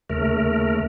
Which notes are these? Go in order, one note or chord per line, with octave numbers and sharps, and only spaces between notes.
D#2 C#3 A3 A#4